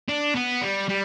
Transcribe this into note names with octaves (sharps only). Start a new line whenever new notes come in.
D4
B3
G3
G3